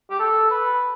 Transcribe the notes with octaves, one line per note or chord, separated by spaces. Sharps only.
G4
A4
B4